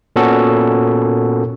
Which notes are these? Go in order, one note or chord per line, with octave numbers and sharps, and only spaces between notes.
A#2 B3 C#4 F#4 A4 A#4